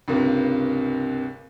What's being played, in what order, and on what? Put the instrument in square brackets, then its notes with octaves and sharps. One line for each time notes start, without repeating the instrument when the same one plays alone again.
[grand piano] C#2 G2 C3 A#3